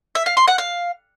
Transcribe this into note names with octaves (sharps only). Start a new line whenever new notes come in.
E5
F5
C6
F#5
F5